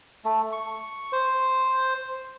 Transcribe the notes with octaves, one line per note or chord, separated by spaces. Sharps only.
A3
C#6
C5